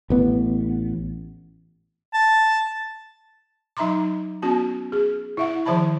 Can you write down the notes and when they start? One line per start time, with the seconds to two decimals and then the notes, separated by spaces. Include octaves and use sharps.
0.10 A1 B3
2.14 A5
3.77 F#3 D#4 E5 A#5 C6 D6
4.42 B3 C#4 F#4 A5
4.92 G#4
5.37 E4 E5 F#5
5.66 D#3 F3 C5 E5 A5 B5